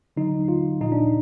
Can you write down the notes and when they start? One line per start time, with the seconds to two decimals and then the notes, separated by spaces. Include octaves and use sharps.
0.17 D3 F#3 D#4
0.48 F4
0.81 A#2 F3 D#4
0.92 D4